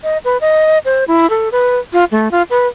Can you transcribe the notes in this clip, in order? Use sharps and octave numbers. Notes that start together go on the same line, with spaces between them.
D#5
B4
D#5
C5
E4
A4
B4
F4
A3
F4
B4